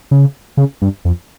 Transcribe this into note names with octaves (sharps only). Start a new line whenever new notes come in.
C#3
C#3
G2
F2